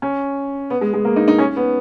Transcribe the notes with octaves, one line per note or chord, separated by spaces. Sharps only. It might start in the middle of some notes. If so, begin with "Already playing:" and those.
C#4
B3
G#3
G#3
A#3
D#4
D#4
C#4
B3